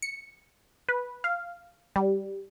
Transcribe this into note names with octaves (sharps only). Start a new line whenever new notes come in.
C#7
B4
F5
G3